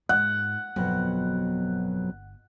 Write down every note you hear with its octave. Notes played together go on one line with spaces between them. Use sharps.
G#2 F#5
G1 F2 B2 F#3